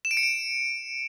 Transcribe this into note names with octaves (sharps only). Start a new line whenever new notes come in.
E7
D7
C#7
D7